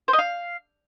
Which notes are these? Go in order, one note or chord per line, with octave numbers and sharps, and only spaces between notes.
C5
D#5
F5